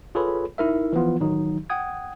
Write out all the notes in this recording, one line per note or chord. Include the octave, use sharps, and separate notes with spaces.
F4 G#4 A4 B4 C#5 B5
D#4 E4 A#4 E5
E3 F3 B3 F4
A1 D#3 F#3 D#4
F#5 G5 D#6 G#6